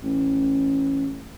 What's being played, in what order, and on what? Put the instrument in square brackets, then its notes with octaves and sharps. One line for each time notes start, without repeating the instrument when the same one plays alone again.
[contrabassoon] A1